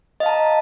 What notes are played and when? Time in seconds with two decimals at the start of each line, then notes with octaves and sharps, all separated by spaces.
0.20 D#5
0.23 F5
0.26 A5
0.29 A#5